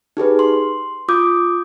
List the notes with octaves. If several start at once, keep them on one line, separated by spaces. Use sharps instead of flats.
D#4 G4 G#4 B4
C6
F4 D6 D#6 G6